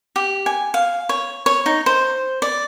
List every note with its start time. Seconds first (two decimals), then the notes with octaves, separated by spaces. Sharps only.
0.16 G4
0.46 G#5
0.74 F5
1.09 C#5
1.46 C#5
1.66 D#4
1.86 C5
2.42 D5